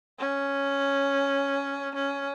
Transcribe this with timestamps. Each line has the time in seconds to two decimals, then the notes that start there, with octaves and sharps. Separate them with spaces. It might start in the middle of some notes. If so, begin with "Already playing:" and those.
0.19 C#4
1.95 C#4